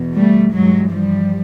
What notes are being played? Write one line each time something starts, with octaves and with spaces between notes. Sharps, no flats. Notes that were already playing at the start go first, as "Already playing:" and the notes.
Already playing: E2 B2
G3 A3
G2 E3 F#3 G#3
F3 G3